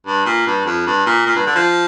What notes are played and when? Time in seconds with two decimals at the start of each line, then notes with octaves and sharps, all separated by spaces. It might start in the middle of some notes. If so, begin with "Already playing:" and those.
0.06 G2
0.26 A#2
0.46 G2
0.66 F2
0.86 G2
1.06 A#2
1.25 A#2
1.36 G2
1.46 D3
1.55 F3